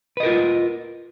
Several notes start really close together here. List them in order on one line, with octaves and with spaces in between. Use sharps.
B4 D#5 A#4 F4